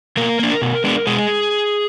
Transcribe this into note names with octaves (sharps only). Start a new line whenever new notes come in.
B2 A#3 A#4
A#3 D4
B2
G#3 B3 D4
B2 G#3 G#4